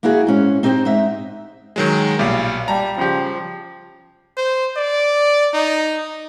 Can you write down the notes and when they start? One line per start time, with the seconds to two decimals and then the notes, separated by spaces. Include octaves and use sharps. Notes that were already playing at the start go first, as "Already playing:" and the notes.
0.03 A#3 B3 E4 F#4 G#4
0.27 G#2 C#4
0.63 C4 D#4 G4 C5 G5
0.85 G#2 D#4 E5
1.76 D#3 F#3 G#3
2.19 B1 A#2 G3 F5
2.68 G3 A5 A#5
2.98 C#3 F3 G4
4.37 C5
4.76 D5
5.53 D#4